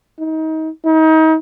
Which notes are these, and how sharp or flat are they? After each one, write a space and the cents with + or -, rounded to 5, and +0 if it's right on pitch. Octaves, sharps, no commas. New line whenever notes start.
D#4 +30
D#4 +35